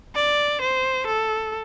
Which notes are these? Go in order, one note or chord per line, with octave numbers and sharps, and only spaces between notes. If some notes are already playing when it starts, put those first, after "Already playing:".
D5
C5
A4